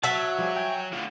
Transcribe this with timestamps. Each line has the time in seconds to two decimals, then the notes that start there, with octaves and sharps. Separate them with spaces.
0.03 F#3 F#4 E5 A5
0.39 F3 G3 G#4
0.56 G5 G#5
0.93 A2 D3 F4